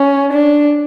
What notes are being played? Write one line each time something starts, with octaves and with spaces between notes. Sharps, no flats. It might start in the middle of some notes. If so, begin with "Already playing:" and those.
Already playing: C#4
D4